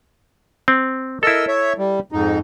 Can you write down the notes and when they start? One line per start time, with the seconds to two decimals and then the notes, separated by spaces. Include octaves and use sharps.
0.68 C4
1.23 E4 A4 A#4 D#5 E6
1.48 C#5 E5
1.78 G3
2.12 F2 G#2 D#4